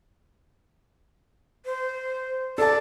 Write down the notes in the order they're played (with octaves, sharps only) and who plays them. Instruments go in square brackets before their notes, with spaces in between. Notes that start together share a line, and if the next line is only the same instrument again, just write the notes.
[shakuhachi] C5
[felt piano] A4 A5 [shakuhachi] D5